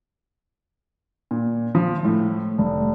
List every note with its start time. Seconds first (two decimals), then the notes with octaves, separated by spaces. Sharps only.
1.31 A#2
1.75 F3
2.04 A2
2.58 F1